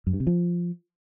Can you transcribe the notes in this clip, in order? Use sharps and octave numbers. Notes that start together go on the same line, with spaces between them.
F#2
G2
C3
F3